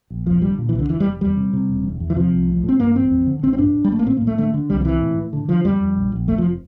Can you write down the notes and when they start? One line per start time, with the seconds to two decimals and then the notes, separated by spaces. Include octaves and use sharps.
0.10 A#1
0.26 F1 F3
0.42 D3 G3
0.58 A#2
0.69 E3
0.73 C2
0.79 D3
0.90 F1 E3
1.00 G3
1.05 F1
1.21 E2 G3
1.37 C3
1.53 C3
1.69 E1
1.84 E2
2.00 E2
2.10 E3
2.16 C3 F3
2.33 C2
2.48 A1
2.63 A2
2.69 C4
2.80 G2 A#3
2.96 A1 C4
3.11 F2
3.26 D3
3.43 A1 C4
3.53 C4
3.59 G2 D4
3.74 A2
3.84 G3
3.90 A1 A3
3.99 A#3
4.06 A2 C4
4.17 A#3
4.22 A2
4.27 A3
4.38 D3 A3
4.54 D3
4.70 C2 G3
4.81 F3
4.85 C3 E3
5.02 A2
5.17 A2
5.33 D3
5.48 D3 F3
5.64 F2 G3
5.80 F2
5.96 A#1
6.12 A#1
6.28 F1 A3
6.38 F3